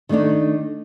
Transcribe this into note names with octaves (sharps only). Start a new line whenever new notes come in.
D#3 G3 A3 D4 D#4